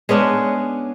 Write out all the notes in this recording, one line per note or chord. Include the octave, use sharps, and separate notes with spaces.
G#3 B3 C#4 D4